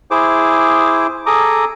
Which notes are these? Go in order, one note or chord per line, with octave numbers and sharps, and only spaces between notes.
E4 G#4 C5 D6
G#4 A4 A#5 D6 D#6